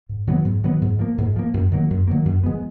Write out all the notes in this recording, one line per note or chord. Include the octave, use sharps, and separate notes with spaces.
G#2
D#3 F#3 B3
G#2
D#3 F#3 B3
G#2
F3 A#3
G#2
F3 A#3
F#2
D#3 F#3 A#3
F#2
D#3 F#3 A#3
F#2
F3 G#3 B3